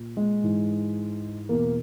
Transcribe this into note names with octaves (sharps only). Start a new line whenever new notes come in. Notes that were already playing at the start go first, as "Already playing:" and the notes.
Already playing: A#2
G#3
G#2 E3
E2 B2 A#3